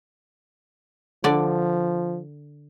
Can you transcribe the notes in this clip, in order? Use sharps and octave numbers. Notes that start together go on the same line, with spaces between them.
D3 F3 D5